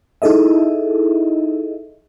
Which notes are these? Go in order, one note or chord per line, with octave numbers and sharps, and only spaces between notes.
D#4 E4 G#4 A4 D#5 E5